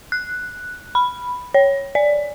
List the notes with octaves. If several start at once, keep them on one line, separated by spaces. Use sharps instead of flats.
F#6
B5
C#5
D5